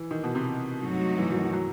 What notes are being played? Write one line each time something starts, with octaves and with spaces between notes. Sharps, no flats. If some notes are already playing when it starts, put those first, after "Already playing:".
Already playing: E3
D#3
B2
C3
G2 F#3 A3 D#4 F#4
E3
D#3
F#3